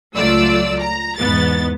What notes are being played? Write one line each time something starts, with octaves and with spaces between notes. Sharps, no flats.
C#2 F#3 A3 F4 D5 E6
A#5
E2 G#2 B3 A6